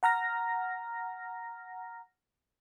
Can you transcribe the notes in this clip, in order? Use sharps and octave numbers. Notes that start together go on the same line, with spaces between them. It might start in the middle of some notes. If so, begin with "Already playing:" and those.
F#5 A#5 F6 A#6